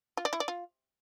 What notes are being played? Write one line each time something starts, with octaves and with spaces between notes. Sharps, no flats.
F4
D5
E4
D5
F4